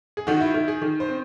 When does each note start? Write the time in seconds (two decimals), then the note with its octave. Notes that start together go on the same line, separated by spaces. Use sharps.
0.17 G#4
0.27 D#3 F#4
0.41 E4
0.54 D#3 E4
0.68 G#4
0.82 D#3
1.00 C5
1.09 C4